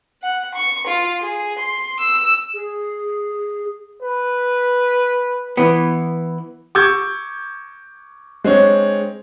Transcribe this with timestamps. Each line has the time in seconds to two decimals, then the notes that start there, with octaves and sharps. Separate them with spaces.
0.21 F#5
0.55 C#6
0.87 F4
1.20 G#4
1.60 C6
2.00 E6
2.54 G#4
4.02 B4
5.57 E3 B3
6.75 C#6 D6 E6 G6 G#6
8.44 G#3 C4 D4 C#5